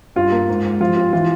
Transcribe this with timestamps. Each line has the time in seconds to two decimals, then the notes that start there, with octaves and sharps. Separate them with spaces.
0.16 G2 F4
0.32 A#3
0.49 G#2
0.64 G#2
0.80 F3 F4
0.96 C4 F4
1.13 E3 F4